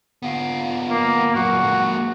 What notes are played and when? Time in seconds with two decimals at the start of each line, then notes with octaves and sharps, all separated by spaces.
0.23 B3 F4
0.90 A#3
1.35 F#2 A#2 F#4
1.62 G#3 A#3